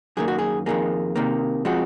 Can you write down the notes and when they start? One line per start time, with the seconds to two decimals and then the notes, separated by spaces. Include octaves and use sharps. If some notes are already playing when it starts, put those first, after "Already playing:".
0.17 F#2 D#3 A#3 G#4
0.28 F#4
0.38 G#4
0.66 F2 D#3 A#3 G#4
1.16 C3 D#3 A#3
1.65 F3 G#3 C4 F#4